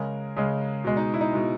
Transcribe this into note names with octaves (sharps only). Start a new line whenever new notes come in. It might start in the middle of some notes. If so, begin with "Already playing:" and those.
Already playing: C#3 G#3 A#4
C#3 G#3
B2 G#3
D#4
E4
D#4
B2 G#3